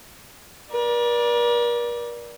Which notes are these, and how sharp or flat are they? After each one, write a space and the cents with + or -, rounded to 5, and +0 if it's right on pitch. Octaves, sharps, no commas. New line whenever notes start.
A#4 +45 D5 +0